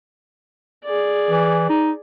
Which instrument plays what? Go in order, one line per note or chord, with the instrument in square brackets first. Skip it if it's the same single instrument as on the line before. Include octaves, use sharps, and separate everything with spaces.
[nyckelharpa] G#4 D5
[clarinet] E3
D#4